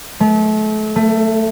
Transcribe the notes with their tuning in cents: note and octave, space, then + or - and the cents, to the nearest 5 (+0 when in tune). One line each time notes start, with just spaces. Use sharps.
A3 -35
A3 +15